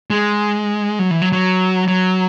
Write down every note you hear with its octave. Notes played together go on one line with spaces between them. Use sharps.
G#3
F#3
E3
F#3
F#3
F#3